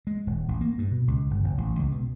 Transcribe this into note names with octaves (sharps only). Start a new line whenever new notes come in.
G#3
D#1
A1
A#3
G2
B2
C#2
G1
F#1
A1
C#2
B2